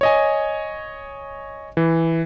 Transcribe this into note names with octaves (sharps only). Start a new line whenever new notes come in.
C#5 D#5 G#5
E3